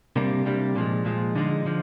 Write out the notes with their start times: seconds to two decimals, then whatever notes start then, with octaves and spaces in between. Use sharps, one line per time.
0.16 C3 G3 A#3 D4
0.46 C3 G3 A#3 D4
0.76 A#2 F3 G#3
1.05 A#2 F3 G#3
1.35 D3 F3 G#3 D#4
1.65 D3 F3